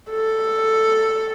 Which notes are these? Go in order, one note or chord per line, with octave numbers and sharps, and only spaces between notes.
A4